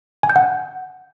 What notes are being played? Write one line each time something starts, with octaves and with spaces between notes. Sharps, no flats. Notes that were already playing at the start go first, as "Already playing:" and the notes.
G#5
G6
F#5